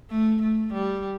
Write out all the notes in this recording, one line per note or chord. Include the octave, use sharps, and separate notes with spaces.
A3
A3
G3